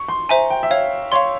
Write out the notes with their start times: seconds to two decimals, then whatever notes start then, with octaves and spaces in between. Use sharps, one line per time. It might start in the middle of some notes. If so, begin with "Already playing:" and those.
Already playing: C#6
0.08 C6
0.29 C5 E5 G#5 A#5
0.50 G5
0.63 E5
0.71 C#5 F5
1.12 C#5 F5 C6